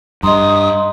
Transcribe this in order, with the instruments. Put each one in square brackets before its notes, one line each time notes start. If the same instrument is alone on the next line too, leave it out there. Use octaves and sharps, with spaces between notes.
[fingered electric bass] G2 [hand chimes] D#5 A#5 [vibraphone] C6 [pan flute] D#6